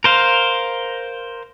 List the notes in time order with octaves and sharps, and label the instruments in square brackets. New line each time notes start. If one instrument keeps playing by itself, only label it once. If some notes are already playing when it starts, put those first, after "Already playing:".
[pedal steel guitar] A#4 C5 F5